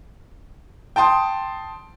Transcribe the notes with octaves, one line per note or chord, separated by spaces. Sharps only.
G5 A5 C6 D#6